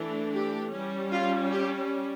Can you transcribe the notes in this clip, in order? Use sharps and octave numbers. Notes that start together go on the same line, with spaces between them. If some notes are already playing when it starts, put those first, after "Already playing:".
Already playing: E3 A3 D4
G4
G3 C#4
F4
G4